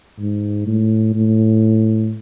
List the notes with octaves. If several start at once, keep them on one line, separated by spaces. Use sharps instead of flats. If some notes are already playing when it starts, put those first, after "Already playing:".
G#2
A2
A2